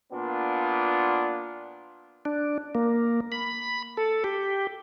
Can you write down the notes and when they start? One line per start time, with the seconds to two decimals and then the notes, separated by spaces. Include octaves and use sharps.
0.12 A#2 B3 D4 F4
2.25 D4
2.75 A#3
3.32 B5
3.97 A4
4.24 G4